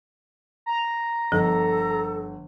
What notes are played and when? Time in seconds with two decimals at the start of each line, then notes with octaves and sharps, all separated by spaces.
0.66 A#5
1.32 G1 F3 A4